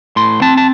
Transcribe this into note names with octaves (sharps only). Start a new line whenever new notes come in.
A2 C6
C4 A5
A5